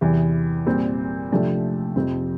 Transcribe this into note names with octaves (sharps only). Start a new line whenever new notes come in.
E2 C3 E3
A#2 G3 C4
C3 F3 A3 D4
F2 C3 F3 C4